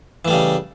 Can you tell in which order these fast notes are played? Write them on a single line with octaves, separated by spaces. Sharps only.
E3 A3 G3 C#3